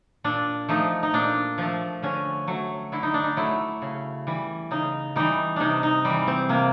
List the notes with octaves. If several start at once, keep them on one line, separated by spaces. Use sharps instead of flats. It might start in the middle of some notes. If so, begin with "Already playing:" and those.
A#2 D4
F3 A3 D#4
D#4
A#2 D4
F3 A3
D3 C#4
F#3 A3
D3 E4
D#4
D4
D#4
F#3 A3 E4
C#3
E3 G3
C#3 D#4
E3 G3 D#4
C3 D4 D#4
D#4
E3 G3
C4
C3 A#3